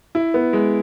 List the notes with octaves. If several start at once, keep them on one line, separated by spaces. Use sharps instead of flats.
E4
B3
G#3